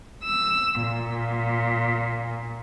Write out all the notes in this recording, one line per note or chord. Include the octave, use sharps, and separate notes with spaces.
E6
A#2